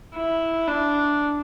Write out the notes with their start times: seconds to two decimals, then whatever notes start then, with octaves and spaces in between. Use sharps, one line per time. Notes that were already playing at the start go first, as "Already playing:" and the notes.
0.15 E4
0.67 D4